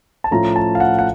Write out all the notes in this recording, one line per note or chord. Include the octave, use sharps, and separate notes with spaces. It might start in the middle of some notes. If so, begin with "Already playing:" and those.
A5
A2 F3 A3 C#4 F4 A#5
A5
F5
F#5
F#5